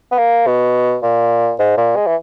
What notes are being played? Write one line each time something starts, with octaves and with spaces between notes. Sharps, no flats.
B3
A#3
B2
A#2
G#2
A#2
G#3
E3